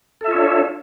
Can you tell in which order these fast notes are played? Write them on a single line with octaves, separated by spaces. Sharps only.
A4 E5 F4 C#5 D4